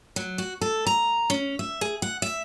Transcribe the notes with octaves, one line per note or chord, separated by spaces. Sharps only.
F#3
F#4
A4
A#5
C#4
E5
G#4
F#5
E5